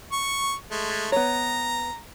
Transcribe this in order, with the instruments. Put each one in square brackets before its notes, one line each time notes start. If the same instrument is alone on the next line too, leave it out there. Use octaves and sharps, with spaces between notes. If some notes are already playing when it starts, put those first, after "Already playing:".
[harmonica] C#6
G#3 A3
[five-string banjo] B3 C#5 [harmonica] A#5